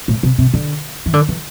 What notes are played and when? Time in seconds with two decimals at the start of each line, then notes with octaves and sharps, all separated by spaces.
0.08 A2
0.23 C3
0.38 C3
0.53 D3
1.06 E3
1.13 D3
1.28 E3